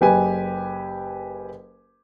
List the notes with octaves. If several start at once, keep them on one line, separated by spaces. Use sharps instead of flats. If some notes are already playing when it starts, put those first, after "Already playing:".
F#1 G4 B4 G#5